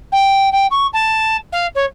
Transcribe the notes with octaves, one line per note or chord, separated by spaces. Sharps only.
G5
G5
C#6
A5
F5
C#5